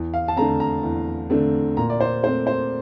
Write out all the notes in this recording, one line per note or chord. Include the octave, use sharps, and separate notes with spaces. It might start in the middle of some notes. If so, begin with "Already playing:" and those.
Already playing: E2
F5
A5
D3 A3 C4 A#5
A#5
E2
D3 A3 C4
A#2 A#5
D5
C5
A3 C4 C5
C5